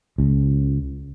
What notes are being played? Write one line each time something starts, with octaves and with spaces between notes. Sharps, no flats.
C#2